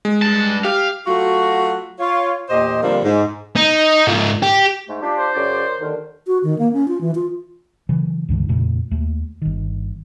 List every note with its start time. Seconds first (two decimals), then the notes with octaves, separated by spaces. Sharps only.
0.05 G#3
0.22 G2 A5
0.65 G4 F5
1.07 F#3 A3 F4 F#4
2.00 F4 C#5
2.49 E2 A#2 G4 C5 D#5
2.83 D3 F3 G3 A#3 C4 D4
3.04 G#2
3.56 D#4
4.07 G#2 F4
4.42 G4
4.88 G#2 G#3 A3
5.01 D4 F4 G4
5.18 C5
5.34 F#2 C#3 D5
5.79 D#2 D3 D#3
6.27 F#4
6.44 D#3
6.59 A#3
6.73 C#4
6.88 F4
7.01 E3
7.15 F4
7.89 C#3 E3 F#3
8.29 C#2 G2 D3 E3
8.49 F2 A#2 C#3 A3
8.91 D#2 A3
9.42 G1 D#3